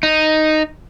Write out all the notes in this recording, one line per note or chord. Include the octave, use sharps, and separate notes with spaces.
D#4